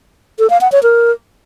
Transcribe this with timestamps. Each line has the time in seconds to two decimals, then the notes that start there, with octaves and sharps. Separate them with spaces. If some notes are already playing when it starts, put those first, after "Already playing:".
0.39 A4
0.50 F5
0.61 F#5
0.72 C#5
0.83 A#4